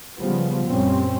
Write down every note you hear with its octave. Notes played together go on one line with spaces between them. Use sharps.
C#3 F3 G3 B3
F#2 A#2 G3 C4 C#4